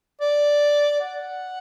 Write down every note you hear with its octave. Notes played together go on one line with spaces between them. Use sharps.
D5
F#5